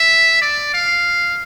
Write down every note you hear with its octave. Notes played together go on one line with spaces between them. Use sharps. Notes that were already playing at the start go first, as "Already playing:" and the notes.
Already playing: E5
D5
F5